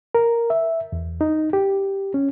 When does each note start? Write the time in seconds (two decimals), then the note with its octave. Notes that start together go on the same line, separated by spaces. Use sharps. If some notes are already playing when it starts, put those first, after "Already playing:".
0.15 A#4
0.50 E5
0.92 E2
1.21 D#4
1.53 G4
2.14 C#4